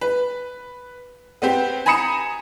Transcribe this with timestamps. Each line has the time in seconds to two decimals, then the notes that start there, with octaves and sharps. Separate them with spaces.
0.01 B4
1.42 B3 C4 G4
1.86 G#5 A#5 B5 D#6 C#7 E7